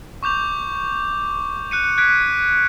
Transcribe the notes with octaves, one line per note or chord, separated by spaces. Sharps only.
C#6 D6 G6 F7
F#6 C#7 D#7
F#6 G#6 B6 D7